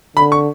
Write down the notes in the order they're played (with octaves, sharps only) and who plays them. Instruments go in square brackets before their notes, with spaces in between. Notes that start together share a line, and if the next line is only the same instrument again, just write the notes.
[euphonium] D3 [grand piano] B5
[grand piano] C#6